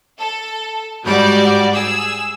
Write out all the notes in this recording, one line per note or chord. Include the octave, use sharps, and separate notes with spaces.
A4
G#2 G3 F#4 D5
G#4 E6